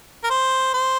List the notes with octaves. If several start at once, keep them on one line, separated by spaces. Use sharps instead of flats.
A#4
C5
C5